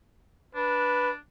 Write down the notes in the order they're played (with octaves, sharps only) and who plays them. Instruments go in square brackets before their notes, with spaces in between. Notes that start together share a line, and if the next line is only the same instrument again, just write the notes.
[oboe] D4 [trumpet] B4